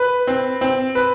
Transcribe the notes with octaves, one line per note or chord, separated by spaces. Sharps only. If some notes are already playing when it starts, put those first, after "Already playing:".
Already playing: B4
C4
C4
B4